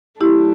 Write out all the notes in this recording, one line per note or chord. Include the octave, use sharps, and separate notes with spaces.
F#3 A3 D4 E4 G4